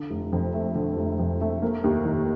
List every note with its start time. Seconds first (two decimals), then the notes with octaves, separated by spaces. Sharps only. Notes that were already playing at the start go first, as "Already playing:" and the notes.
Already playing: D3
0.10 F1
0.33 F2
0.54 A3
0.75 D3
0.97 F1
1.19 F2
1.41 A3
1.62 A#3
1.84 D#2
2.05 D#3